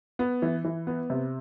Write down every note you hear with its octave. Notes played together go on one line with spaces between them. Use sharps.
B3
E3
E3
B3
C3